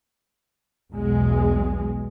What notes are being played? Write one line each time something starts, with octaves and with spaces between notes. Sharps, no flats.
B1 E2 G#3